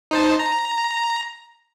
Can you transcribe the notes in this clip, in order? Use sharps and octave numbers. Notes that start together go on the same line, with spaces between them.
D#4 C5 A5
A#5